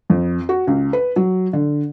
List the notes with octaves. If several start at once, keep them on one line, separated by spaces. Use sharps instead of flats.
F2
F#4
C#2
B4
F#3
D3